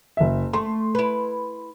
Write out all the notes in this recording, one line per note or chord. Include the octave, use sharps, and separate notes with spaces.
F#1 E5
A3 C6
E4 B4